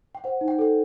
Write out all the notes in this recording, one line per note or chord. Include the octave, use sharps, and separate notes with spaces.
G5
C5 F#5
D#4
G5
A4 G5